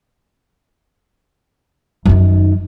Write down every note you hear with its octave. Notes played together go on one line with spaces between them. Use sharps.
F#2 D#3